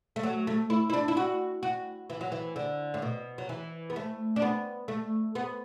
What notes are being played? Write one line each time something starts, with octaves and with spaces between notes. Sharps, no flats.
A3
F#3
A3
E4
E4
D4
E4
F#4
F#4
E3
F#3
E3
D3
A2
B2
F#3
E3
B3
A3
D4
B3
A3
B3